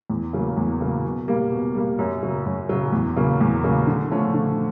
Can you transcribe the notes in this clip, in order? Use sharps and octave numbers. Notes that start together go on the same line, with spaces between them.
E2
C#3 F#3 A#3
E2
C#3 F#3 A#3
B2
G3 A#3
B2
G3 A#3
F#2
C#3 F#3
F#2
C#3 F#3
E2
C#3 F#3 A#3
E2
C#3 F#3 A#3
D3
F3 A3 C#4
D3